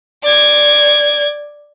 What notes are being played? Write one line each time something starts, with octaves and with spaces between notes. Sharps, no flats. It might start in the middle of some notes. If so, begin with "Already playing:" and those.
D5 G#6